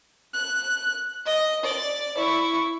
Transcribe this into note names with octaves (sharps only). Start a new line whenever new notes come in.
F#6
D#5
D5
E4 C#6